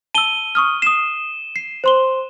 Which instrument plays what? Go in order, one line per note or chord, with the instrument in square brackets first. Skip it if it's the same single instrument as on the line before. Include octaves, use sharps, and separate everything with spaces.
[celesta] A5 E6 [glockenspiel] D#7 G7
[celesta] C#6 D#6 F6
[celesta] D#6 C7 [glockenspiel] E7
[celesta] C7
C5 C6 G7